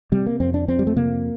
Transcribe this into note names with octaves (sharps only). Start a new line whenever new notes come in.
C3 G3
A#3
F2 C4
D4
F2 C4
G3
A3
C3 A#3